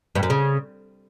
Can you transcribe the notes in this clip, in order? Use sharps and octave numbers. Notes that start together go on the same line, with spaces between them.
G2
F#2
C#3